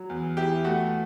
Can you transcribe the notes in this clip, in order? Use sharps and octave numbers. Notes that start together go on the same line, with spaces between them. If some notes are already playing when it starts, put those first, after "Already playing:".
Already playing: F#3
E2
E2 E4 G4
A3 F#4